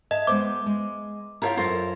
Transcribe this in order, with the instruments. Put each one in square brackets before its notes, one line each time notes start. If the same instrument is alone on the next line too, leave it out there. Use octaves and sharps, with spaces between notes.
[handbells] D#5 [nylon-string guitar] E5 A5
[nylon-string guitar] G#3 B3 C5 [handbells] D6
[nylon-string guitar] G#3
[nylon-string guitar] E4 G4 C#5 [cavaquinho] F4 G#4 A#4
[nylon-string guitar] F#2 A4 A#4 [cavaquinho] F4 C5 C#5